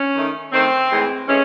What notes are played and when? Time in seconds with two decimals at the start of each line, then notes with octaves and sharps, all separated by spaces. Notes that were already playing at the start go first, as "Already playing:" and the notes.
Already playing: C#4
0.15 D#3 A3
0.52 D#3 A3 C4
0.90 A2 E3 G#3
1.27 A2 E3 G#3 C#4